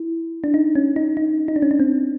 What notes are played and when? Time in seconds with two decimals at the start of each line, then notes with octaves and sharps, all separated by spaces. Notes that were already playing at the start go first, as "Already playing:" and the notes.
Already playing: E4
0.44 D4
0.54 D#4
0.75 C#4
0.96 D#4
1.17 D#4
1.48 D#4
1.56 D4
1.62 C#4
1.71 D4
1.80 C4